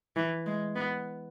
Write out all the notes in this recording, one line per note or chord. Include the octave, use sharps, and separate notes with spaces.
E3
G#3
B3